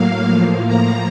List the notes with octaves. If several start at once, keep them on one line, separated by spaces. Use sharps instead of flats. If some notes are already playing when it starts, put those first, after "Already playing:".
Already playing: A2 F#3 A#3 F5
A2 F3 A#3
A#5